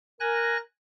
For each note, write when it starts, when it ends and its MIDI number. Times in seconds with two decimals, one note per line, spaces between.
0.20 0.58 70
0.20 0.57 80
0.20 0.57 90
0.20 0.57 94